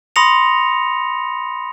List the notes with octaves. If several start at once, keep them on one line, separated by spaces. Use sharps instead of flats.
B5 C6 D#6 A#6 C#7 F7